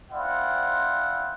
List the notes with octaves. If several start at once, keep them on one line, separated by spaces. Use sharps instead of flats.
C4 E4 C5 D5 F5 F#5